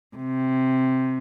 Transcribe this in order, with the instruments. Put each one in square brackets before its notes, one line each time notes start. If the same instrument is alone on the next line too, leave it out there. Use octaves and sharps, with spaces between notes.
[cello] C3